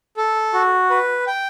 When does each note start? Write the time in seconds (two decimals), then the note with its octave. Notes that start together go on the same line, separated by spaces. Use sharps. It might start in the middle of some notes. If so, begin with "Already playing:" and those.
0.17 A4
0.53 F#4
0.90 B4
1.27 G5